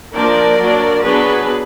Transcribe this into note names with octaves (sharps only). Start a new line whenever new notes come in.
F3 A#3 D4 A#4 D5
F#3 A#3 D4
F#3 B3 D4 G#4 B4